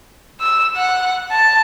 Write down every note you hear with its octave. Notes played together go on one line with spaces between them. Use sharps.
E6
F#5
A5